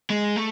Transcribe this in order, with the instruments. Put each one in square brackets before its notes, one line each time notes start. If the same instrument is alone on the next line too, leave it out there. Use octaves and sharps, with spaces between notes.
[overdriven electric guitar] G#3
A3